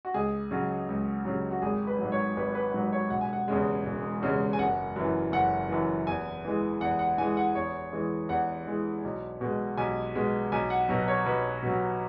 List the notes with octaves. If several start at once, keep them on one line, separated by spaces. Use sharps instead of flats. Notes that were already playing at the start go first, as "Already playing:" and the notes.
F#4
C#2 G#4
C#3 F#3
C#2
C#3 F#3
F#4
G#1 G#4
B4
G#2 F#3
C#5
G#1 B4
B4
G#2 F#3
C#5
E1 F#5
G#5
F#5
E2 C#3 G#3
E1
E2 C#3 G#3
G#5
F#1 F#5
F#2 E3
F#1 F#5
F#2 E3
E2 G#5
E3 G#3
E2 F#5
F#5
E3 G#3 G#5
F#5
E2 C#5
E3 G#3
E2 F#5
E3 G#3
B1
B2 G#3
B1 G#5
B2 G#3
B1 G#5
F#5
B2 F#3
C#5
B1 B4
B2 F#3